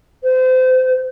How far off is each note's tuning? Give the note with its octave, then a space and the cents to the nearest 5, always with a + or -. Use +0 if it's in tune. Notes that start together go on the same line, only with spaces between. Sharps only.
C5 -30